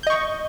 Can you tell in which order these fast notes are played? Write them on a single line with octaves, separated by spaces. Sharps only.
G6 D#5 C#6